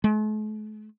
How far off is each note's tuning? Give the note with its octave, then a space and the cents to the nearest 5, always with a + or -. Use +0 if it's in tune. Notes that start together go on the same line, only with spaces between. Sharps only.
A3 -45